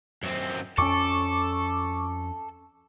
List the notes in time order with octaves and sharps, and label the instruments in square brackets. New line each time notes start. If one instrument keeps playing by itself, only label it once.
[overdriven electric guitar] F#2 C4
[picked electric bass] F2 C#4 [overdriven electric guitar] A4 [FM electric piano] C#6 D6